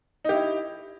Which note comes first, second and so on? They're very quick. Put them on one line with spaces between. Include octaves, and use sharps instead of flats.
D#4 G4 E4